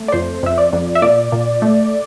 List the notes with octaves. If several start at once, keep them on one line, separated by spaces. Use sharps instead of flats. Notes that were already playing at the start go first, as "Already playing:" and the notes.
Already playing: A3
D5
F2 C5
F2 E5
D5
F2
E5
A#2 D5
A#2
A3